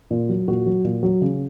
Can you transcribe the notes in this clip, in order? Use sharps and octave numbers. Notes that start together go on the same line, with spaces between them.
A#2
F#3
A#2 F#4
F#3
A#2
F#3
C#3